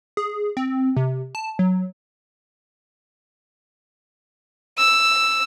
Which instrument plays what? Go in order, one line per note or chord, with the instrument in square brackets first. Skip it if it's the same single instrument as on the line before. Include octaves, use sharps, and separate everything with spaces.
[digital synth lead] G#4
C4
C3
A5
F#3
[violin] E6